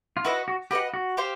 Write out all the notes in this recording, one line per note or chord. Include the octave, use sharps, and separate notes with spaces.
F4
E4 F#4 B4 D#5 F#5
F#4
F#4 G4 B4 D#5 F#5
F#4
G4 C5 F5